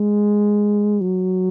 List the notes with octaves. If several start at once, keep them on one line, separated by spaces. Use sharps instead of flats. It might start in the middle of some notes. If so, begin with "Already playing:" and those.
Already playing: G#3
F#3